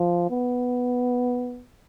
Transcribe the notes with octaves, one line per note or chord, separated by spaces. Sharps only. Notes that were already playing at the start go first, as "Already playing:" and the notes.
Already playing: F3
B3